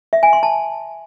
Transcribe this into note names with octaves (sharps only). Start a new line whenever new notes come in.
E5
G#5
C6
A5